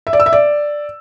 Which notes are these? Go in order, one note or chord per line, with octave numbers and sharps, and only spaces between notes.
E5
D5
E6
E5
D5